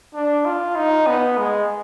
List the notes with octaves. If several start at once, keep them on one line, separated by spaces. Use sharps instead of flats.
D4
F4
D#4
B3
G#3